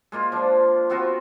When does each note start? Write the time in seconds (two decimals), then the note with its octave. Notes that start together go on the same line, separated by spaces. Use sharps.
0.12 G#3 A#3 F4
0.32 F3 D4
0.90 B3 C4 F4 F#4